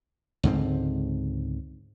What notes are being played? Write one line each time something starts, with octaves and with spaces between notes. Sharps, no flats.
C#2 G#2 D3 C4